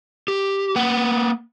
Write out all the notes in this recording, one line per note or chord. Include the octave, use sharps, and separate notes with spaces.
G4
A#3 B4 F#5